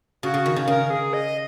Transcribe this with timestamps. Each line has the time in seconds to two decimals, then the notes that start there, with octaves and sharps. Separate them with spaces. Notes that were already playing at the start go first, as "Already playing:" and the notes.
0.23 C#3 F#4
0.34 C#3
0.46 D#3
0.56 C#3
0.68 C#3 A#4
0.90 G#4
1.13 D#5